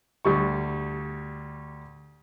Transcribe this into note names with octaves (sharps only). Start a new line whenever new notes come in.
D2 G3 C#6